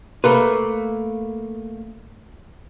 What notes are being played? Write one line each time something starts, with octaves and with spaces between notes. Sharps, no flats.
A3 A#3 B4